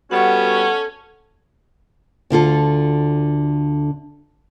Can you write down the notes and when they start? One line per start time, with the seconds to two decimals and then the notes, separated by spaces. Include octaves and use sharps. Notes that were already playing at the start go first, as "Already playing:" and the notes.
0.11 G3 B3 C#4 F#4 A4 F#5 C#6
2.30 D2 D3 F4 A4